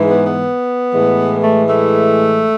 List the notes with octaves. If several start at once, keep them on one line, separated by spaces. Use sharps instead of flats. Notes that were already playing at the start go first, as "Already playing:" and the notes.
Already playing: G#2 E3 G#3
B3
B3
A2 E3 G#3
A3
A3